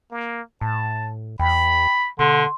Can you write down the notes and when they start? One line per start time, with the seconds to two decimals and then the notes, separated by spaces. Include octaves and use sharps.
0.12 A#3
0.61 A2 A5
1.39 E2 G5 B5
2.19 B2 D3 C6